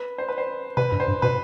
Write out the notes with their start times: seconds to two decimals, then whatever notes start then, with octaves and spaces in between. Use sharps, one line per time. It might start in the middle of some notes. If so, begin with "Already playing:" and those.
Already playing: B4
0.18 C5
0.29 B4
0.38 C5
0.77 C3 B4
0.92 G2
1.00 C5
1.08 G2
1.22 B2 B4